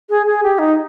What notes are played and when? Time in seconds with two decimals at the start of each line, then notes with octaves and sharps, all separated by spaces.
0.10 G#4
0.26 G#4
0.43 G4
0.59 D#4